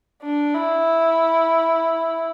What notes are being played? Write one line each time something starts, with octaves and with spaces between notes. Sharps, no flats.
D4
E4